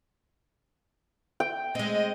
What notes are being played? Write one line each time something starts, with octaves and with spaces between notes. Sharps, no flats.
G5
G#3 C4 D#5